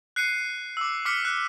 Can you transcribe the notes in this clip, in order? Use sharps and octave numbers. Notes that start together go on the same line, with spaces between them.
F#6 C7 C#7 D#7
D6 E6
D6 F6 B6 C#7
F#6